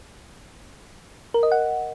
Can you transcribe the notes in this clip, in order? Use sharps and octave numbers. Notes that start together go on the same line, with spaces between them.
A#4
D#5
F#5